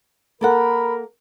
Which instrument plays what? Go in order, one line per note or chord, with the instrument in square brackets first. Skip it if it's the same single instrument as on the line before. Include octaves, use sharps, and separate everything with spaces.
[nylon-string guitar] A#3 A4 F#5 [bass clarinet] A#4 [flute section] A#5 B5